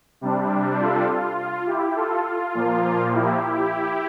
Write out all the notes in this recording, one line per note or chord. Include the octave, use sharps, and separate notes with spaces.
C3 G3 D4
F4 A4
F4
F4
E4 G4
F4 A4
F4
A#2 F3 A#3
E4 G4